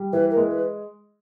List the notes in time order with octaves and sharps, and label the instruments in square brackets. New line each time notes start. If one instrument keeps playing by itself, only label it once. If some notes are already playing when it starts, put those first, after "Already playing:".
Already playing: [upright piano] G3
[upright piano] E3 [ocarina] B4
[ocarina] A#4
[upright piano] G#3
[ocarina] B4